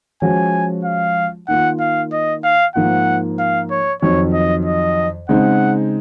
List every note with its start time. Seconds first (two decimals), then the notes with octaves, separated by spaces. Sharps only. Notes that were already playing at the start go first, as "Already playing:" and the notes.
0.22 F3 G#3 C#4 F#4 G#5
0.85 F5
1.48 D#3 A#3 F4 F#5
1.80 F5
2.12 D#5
2.44 F5
2.75 G#2 F3 A#3 F4 F#5
3.39 F5
3.71 C#5
4.02 F2 D#3 F#3 C#5
4.33 D#5
4.65 D#5
5.29 C#3 G#3 C4 D#4 F#5